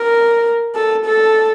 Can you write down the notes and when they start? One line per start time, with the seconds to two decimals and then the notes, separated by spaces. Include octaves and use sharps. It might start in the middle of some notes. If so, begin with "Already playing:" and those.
Already playing: A#4
0.75 A4
1.05 A4